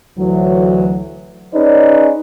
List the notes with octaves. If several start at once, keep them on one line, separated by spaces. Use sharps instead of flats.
D2 E3 F#3
C#4 D#4 G#4 B4 C#5 D5